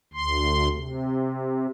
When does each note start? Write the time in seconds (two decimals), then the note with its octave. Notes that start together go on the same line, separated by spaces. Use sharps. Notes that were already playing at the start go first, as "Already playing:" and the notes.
0.14 D2 C6
0.74 C3